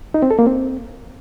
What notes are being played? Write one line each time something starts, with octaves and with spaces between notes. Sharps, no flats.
D#4
C4
A4
A#3
C4